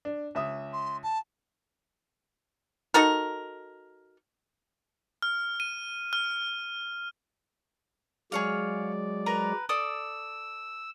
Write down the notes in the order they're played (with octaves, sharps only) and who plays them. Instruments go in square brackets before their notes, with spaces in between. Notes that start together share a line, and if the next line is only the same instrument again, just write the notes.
[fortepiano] D4
C#2 E5 D#6
[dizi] C6
A5
[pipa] D#4 F#4 A4 A#4
[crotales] F6
D#7
F6
[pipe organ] F#3 G#3 D5 [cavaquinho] G#4 C#5 F5
[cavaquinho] A#4 B4 A#5
[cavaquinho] A4 D5 D#6 [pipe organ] E6